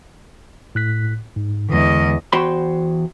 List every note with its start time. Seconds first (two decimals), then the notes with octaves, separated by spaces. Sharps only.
0.75 A2 F#6 B6
1.36 G#2
1.69 E2 D3 G#3 D#5
2.33 E2 F#4 C5 G5 B5 C6